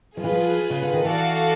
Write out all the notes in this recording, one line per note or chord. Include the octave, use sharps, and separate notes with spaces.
F3 F4 G#4 B4
E3
F3
C#3
D3
D#3
E3 F#4 A4 D5 F5